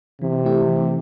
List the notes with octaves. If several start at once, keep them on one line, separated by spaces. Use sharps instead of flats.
C3 E3
A3 E4 G4
E3